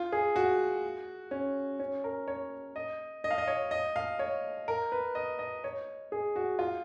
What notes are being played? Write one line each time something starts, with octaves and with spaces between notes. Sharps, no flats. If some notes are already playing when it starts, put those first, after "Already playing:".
Already playing: F4
G#4
F#4
C#4
C#4
A#4
C#5
D#5
D#5
F5
D#5
C#5
D#5
F5
C#5
A#4
B4
D#5
D#5
C#5
G#4
F#4
F4